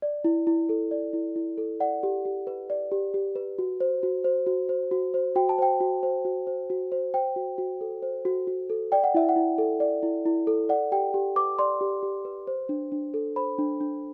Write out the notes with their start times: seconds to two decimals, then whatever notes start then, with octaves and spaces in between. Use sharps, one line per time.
0.02 D5
0.24 E4
0.47 E4
0.69 A4
0.91 D5
1.13 E4
1.36 E4
1.58 A4
1.80 D5 F#5
2.03 G4
2.25 G4
2.47 B4
2.70 D5
2.92 G4
3.14 G4
3.36 B4
3.58 F#4
3.80 C5
4.03 F#4
4.24 C5
4.47 F#4
4.69 C5
4.91 F#4
5.14 C5
5.36 F#4 G5
5.49 A5
5.59 C5 G5
5.80 F#4
6.03 C5
6.25 F#4
6.47 C5
6.70 F#4
6.92 C5
7.14 C5 G5
7.36 F#4
7.58 F#4
7.81 A4
8.02 C5
8.25 F#4
8.47 F#4
8.70 A4
8.92 D5 G5
9.04 F#5
9.14 E4 E5
9.29 F#5
9.36 E4
9.58 A4
9.80 D5
10.03 E4
10.26 E4
10.47 A4
10.69 D5 F#5
10.92 G4 G5
11.14 G4
11.36 B4 D6
11.59 D5 C6
11.81 G4
12.03 G4
12.25 B4
12.47 C5
12.69 D4
12.92 D4
13.14 A4
13.36 C5 B5
13.59 D4
13.81 D4